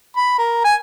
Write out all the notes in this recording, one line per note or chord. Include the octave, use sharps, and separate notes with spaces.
B5
A#4
G#5